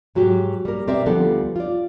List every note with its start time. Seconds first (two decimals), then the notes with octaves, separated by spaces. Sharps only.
0.15 G#2 F#3 F#4 G4
0.65 G3 A#3 A#4
0.87 B2 C4 G4 A#4 D5 E5
1.06 D2 F3 G3 B3 D4 A4
1.56 F4 D5